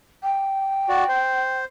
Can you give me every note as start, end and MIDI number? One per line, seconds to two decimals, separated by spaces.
0.24 1.57 79
0.89 1.04 66
0.89 1.04 74
1.09 1.65 72